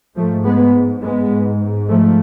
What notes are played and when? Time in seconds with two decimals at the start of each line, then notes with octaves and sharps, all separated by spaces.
0.16 G#2 F3 A3
0.45 G#3 B3
1.02 G#3 B3
1.32 G#2
1.89 F3 A3